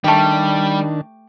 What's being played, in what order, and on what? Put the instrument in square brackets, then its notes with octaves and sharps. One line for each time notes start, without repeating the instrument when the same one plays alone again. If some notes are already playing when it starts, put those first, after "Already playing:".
[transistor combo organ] D#3 D4 [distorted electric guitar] G3 [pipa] A3 G4